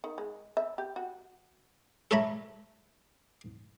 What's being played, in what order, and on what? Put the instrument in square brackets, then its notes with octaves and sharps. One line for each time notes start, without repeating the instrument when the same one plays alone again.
[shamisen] D#3
G#3
E5
G4
F#4
[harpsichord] A4 A#4 C#5 E5 A#5 B5